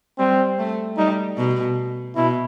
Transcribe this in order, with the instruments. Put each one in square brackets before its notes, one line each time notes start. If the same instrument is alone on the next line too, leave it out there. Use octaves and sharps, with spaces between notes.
[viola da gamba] G3 [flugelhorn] C4
[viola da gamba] A3
[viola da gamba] G3 [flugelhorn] D#4
[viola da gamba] B2
[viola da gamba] B2 [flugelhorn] E4